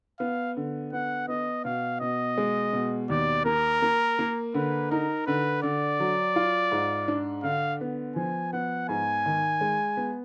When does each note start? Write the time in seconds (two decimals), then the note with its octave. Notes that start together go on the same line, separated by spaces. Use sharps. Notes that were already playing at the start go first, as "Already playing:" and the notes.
0.19 B3 F5
0.57 D3
0.93 B3 F#5
1.28 B3 D#5
1.65 B2 F5
2.00 B2 D#5
2.37 G#3
2.73 B2
3.09 D#2 D5
3.45 A#3 A#4
3.82 A#3
4.19 A#3
4.54 D3 B4
4.91 D#4 A#4
5.26 D3 B4
5.63 D3 D5
6.00 F#3
6.36 F4
6.72 G#2
7.08 D4
7.44 D3 F5
7.81 B3
8.16 F3 G#5
8.53 B3 F#5
8.89 G#2 G#5
9.26 D#3
9.61 G#3
9.97 B3